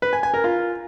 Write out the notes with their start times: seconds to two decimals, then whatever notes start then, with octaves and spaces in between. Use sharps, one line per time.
0.02 B4
0.13 G#5
0.23 G#5
0.34 A#4
0.44 F4